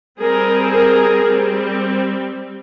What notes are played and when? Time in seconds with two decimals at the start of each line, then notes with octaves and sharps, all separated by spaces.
0.20 G3 C4 G#4 A#4
0.71 G#4 A#4
1.22 G3 C4